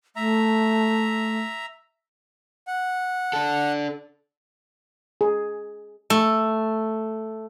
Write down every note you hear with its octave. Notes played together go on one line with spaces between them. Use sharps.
A3 E5 A#5
F#5
D4 A4
G#4
A3